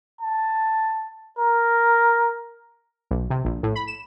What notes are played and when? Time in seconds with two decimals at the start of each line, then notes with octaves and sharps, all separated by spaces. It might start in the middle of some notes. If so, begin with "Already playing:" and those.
0.21 A5
1.38 A#4
3.11 B1
3.30 C3
3.45 A#1
3.63 A2
3.75 B5
3.88 E7